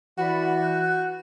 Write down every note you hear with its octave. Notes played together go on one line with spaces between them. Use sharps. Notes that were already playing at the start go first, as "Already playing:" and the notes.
E3 F#4 D5 F#5 B5
F#6 G6